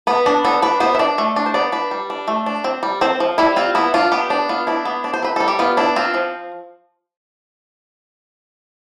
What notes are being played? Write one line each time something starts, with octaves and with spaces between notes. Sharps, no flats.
B3 B4
D4
B3 A4
D4 B4
B3 C5
E5
D4 D5
A3
D4
C5
B3 D5
D4 B4
G3
D4
A3
D4
C4
G3
C4 C5
F3
G3 E4
C4 F4
B3 E4
D4 F4
B3 G4
D4
B3 F4
D4 E4
B3
D4
C5
C4 B4
G3 A4
G4
B3 F4
D4 E4
C4 F4
F3